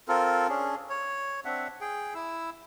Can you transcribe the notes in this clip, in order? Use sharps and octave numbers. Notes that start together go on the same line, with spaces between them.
C4 F4 A4 A#4
C#4 D4 G#4
C#5
C4 D4 E5 F#5
G#4 G5
E4 E6